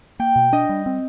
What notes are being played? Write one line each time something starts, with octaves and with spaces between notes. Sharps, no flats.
A#3 G5
B2
D4 D#5
G3
C4